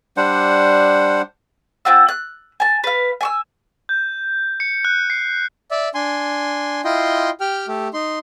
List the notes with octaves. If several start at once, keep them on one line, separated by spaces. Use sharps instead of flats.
G3 D4 C5 F#5
C4 F4 F#5 E6
F#6
G#5 A5
B4 F5
G#5 C#6 E6
G6
C#7
F#6
C7
D5 E5
D4 G#5 C6
E4 F4 D#5 G5 C6
G4 G5 F6
A3 G4
D#4 C6